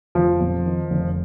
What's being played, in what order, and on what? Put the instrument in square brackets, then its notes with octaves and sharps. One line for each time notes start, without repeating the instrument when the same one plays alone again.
[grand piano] F1 [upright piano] F3
[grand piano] F2
D#3
F1